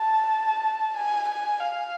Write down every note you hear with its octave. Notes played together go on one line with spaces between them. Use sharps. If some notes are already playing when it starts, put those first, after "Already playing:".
Already playing: A5
G#5
G#5
F5